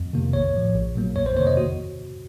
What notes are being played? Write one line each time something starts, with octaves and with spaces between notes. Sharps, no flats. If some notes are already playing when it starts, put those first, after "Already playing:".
Already playing: F2
C3 D#3 A#3
A#1 C#5
A2 F3
A#1
A#2 F#3 A#3
F2 C#5
C5
C3 D#3 A#3 C#5
D#5
F#4